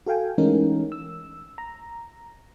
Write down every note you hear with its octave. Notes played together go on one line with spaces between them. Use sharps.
F#4 A4 F5 G5 G#5
E3 G#3 A3 C#4 D#4 A#4
E6
A#5